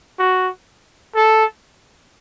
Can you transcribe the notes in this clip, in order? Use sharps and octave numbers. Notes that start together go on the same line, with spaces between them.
F#4
A4